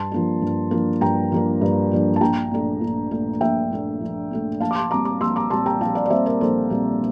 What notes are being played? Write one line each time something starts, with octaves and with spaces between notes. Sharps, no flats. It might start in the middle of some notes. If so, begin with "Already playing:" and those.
Already playing: G2 A5 C6
F3 A#3 D4
G2
F3 A#3 D4
G2 G5 A#5
F3 A#3 D4
G2
F3 A#3 D4
A5
A#1 G5 A#5
A#2 A3 D4
A#1
A#2 A3 D4
A#1 E5 G5
A#2 A3 D4
A#1
A#2 A3 D4
A#1 F5 A5
D6
A5 C6
A#2 G3 C4 A#5 D6
A#5 D6
A#1 C6 E6
A#5 D6
A#2 G3 C4 A5 C6
G5 A#5
A#1 F5 A5
D5 F5
D5
A#2 G3 C4 C5 E5
A#4 D5
A#1 A4 C5
A#2 G3 C4